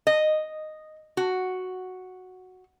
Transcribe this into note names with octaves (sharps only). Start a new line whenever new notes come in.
D#5
F#4